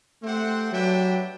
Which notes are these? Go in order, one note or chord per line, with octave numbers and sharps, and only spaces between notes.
A3 C4 G4 C5 F#5
F#3 D4 G4 B4 E5 G5